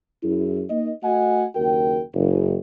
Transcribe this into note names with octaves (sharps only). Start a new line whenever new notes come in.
F#2 E4 G#4
A#3 D#4 D#5
A3 F#4 D#5 F#5 G#5
F#1 D#2 F#4 A#4 G5
F#1